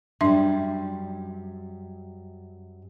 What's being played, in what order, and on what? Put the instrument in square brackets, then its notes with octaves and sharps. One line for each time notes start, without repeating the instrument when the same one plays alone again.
[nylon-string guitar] F#2 G3 [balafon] D4 E5 C6